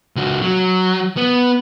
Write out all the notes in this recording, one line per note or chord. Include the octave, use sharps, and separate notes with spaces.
C#2 F#4
F#3
B3